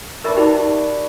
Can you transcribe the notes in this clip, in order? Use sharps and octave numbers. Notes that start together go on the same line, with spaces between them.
D4 A#4 B4 C#5 D#5 E5
D#4 G4 G5